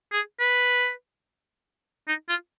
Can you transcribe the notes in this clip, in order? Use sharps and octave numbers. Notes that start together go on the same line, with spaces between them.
G#4
B4
D#4
F4